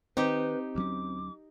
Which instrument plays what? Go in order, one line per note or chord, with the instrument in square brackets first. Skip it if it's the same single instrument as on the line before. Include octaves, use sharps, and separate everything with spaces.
[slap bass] D#3 [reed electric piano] C4 [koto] D#4 G4 [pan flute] B4
[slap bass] D2 F#3 C#4 [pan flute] D6